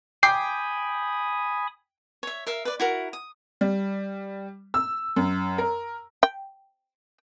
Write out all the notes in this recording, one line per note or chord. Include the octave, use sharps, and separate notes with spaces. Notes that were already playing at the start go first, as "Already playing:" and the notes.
G5 G#5 B5 D6 D#6 C7
C#5 E5
A#4 E5 F5
B4 D5
E4 F#4 A#4
D#6
G3
E6
F#2
A#4
G5